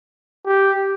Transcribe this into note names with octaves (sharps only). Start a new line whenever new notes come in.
G4